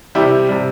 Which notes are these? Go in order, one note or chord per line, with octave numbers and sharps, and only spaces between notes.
C3 G3 E4 G4
C3 G3